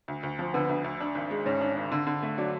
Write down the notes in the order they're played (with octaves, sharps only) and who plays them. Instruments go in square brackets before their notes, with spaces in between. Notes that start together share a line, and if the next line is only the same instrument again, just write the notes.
[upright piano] D2
D2
F3
[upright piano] D3 [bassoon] B3
[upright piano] D2
D2
D4
G#1
G#3
[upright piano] G#2 [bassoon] C#4
[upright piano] D4
G#1
D3
D3
A3
[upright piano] F#3 [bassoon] D4